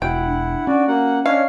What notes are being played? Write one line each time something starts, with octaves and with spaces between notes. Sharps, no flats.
E1 E4 F#4 F#5 G5
D4
C#4 F#4 D5
A#3 F#4 F#5
C#4 D4 C#5 D#5 F5